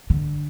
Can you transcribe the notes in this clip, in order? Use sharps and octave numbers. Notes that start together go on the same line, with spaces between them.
D3